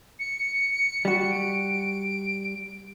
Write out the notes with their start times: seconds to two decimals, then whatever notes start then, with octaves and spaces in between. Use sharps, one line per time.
0.19 C#7
1.05 G3 F#4
1.31 D7